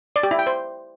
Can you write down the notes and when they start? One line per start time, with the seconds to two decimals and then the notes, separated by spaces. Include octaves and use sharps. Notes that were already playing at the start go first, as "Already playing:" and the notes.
0.16 D5
0.23 G4
0.31 E4
0.39 G5
0.47 C5